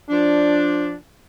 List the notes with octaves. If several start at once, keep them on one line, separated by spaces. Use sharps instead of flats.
F3 D4